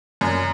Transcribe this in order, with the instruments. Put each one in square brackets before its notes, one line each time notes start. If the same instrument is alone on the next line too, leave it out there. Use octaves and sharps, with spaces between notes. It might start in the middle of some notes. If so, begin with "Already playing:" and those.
[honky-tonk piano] F#2